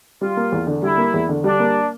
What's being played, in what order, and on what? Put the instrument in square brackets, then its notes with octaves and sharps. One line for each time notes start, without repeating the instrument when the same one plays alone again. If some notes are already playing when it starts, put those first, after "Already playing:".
[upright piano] G3 [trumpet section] F4
[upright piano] A#3
E2
D3
[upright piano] G3 [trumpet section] E4
[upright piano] A#3
E2
D3
[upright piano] G3 [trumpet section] D4
[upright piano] A#3